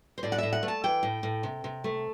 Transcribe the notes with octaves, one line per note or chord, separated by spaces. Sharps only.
C5
A2 D5
F#5
A2 E5
F#5
A3
A5
E3 G5
A2
A2
C3
C3
A3